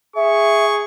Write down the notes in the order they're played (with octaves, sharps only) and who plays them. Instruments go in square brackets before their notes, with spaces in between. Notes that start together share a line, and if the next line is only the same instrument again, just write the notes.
[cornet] G#4 [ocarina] E5 [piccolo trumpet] C#6